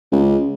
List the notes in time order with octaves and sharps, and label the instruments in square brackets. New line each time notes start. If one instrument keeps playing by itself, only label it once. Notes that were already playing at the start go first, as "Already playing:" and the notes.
[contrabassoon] C#2